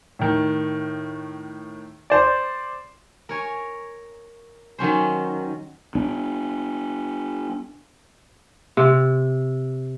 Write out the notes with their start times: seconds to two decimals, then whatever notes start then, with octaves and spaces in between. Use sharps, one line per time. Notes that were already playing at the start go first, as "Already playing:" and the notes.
0.19 A2 D#3
2.10 C5 D5
3.29 A#4 C#5 G#5
4.78 D#3 F#3 C#4 C5
5.95 B3 D4
8.77 C3